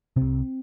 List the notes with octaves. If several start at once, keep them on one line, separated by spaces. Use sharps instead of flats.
C2 C3 C4